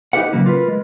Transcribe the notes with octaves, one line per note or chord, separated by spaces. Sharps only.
D#4 E4 G4 A#4 F#5
A#2 C#3 F#3 A#3
F4 A#4 B4
G#3